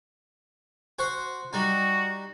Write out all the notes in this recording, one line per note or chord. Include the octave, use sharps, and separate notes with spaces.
F#4 C5 F#5
G3 D#4 F#4